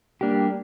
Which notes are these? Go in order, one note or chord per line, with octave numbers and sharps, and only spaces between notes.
G3 A#3 D4 G4